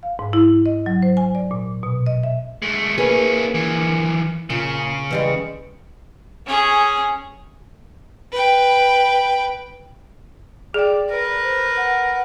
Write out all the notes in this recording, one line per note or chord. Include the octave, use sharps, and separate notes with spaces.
F5
G#2
E4
D#5
F#3
C5
G#5
D5
A#2
B2
D#5
E5
G#3 A3
A#3 C#4 E4 G#4 B4
E3 F3
A#2 C#3
E3 G3 G#3
C#4 G#4
B4 G5
G#4 D5 G5 D6
A#4 B4
C5
F#5